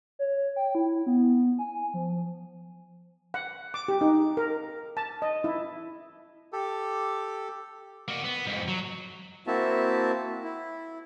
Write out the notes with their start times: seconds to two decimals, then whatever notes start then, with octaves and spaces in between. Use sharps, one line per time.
0.19 C#5
0.56 G5
0.75 E4
1.07 B3
1.59 G#5
1.94 F3
3.34 F#5
3.74 D6
3.88 G4
4.01 D#4
4.37 A#4
4.97 A5
5.22 D#5
5.44 E4
6.53 G4 A4
8.08 A#3 F#4
8.25 B3
8.47 F2 G#2
8.68 F#3
9.47 A#3 C4 E4 F#4 E5 A5
10.44 E4